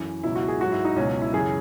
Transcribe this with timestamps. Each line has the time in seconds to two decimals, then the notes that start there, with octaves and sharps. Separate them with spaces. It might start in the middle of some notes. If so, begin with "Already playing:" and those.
Already playing: F#2 E3
0.23 C#2 B2 F#3 E4
0.36 F#4
0.48 G#4
0.60 G#2 F#3 F#4
0.72 E4
0.85 D#4
0.96 C#2 B2 F#3 C#4
1.22 E4
1.33 F#2 C#3 E3 G#4